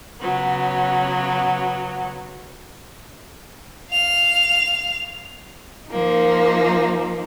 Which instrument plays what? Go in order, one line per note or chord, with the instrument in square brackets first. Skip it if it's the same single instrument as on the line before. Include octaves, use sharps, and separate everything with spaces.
[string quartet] C#3 F#3 B3
[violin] F5 F7
[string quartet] F3 A#3 D#4